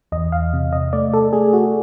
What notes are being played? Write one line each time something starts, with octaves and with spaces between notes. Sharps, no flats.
E2 D#5
F5
C3
D#5
A3 D5
A4
A3 G#4
F#4